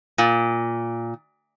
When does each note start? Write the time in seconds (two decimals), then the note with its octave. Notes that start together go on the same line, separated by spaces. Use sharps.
0.18 A#2